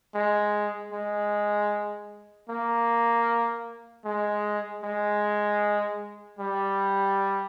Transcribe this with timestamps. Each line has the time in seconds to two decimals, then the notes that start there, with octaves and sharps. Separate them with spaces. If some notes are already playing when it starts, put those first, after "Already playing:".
0.14 G#3
0.92 G#3
2.49 A#3
4.05 G#3
4.83 G#3
6.39 G3